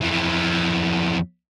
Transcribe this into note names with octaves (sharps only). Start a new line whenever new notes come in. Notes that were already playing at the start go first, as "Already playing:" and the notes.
F2 E3